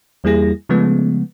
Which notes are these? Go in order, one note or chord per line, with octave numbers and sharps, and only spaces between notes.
E2 G3 A#3 E4 G#4 A#6
C#3 F3 G#3 A3 B3